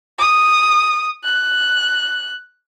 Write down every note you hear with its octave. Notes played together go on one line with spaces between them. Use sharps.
D#6
F#6